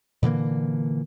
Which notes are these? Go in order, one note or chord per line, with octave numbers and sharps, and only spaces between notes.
A#2 D3 E3 A#3